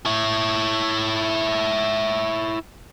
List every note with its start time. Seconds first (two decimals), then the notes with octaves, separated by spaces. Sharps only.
0.06 E4 C#5